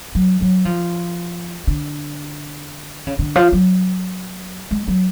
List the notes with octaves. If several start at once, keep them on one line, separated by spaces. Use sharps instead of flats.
F#3
F#3
F3
D3
C#3
D3
F3
F#3
G#3
F#3